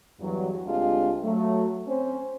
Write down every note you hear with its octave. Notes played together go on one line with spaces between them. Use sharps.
E2 G2 F#3
D2 G#3 C4 D4 F4 G4
F#3 A3
C4 C#4 C5